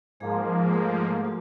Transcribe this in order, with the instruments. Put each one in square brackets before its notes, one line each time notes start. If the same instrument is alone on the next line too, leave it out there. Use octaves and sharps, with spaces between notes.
[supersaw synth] G#2 F3 A#3 [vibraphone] G#3 G#4
[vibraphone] A3 A4
F#3 F#4